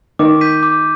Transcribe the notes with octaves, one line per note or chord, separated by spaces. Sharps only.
D#3 D6
G6 B6 D#7
D6